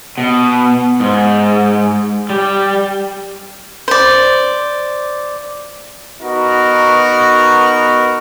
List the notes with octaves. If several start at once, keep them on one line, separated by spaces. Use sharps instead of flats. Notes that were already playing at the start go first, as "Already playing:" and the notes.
B2
G#2
G3
C5 D5
B3 D#4 F#4 A#4